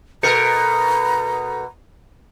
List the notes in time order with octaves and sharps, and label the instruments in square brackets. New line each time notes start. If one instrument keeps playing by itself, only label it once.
[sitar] B2 A#4 [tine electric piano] A4 G6 C#7 [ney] A#5